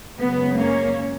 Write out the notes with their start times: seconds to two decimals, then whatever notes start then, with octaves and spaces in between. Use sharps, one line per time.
0.19 F#2 C#3 G#3 B3
0.56 A#3 C#4